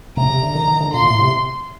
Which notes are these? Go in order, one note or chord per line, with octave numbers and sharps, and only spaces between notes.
C3 A#5
C3
D3
D#3
D#3
D3
A#2 C6
A2
C3